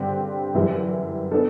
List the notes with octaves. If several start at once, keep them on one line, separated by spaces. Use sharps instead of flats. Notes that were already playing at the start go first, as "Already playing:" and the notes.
Already playing: G2 D3 G3 C4 G4
F#2 E3 G3
B3 D4 A4